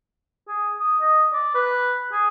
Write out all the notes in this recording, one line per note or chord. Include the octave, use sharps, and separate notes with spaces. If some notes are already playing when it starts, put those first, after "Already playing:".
G#4
D#6
D#5
D5
B4
G#4